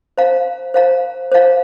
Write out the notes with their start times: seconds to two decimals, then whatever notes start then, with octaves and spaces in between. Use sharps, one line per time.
0.18 C5 F5 A#5
0.74 C5 F5 A#5
1.32 C5 F5 A#5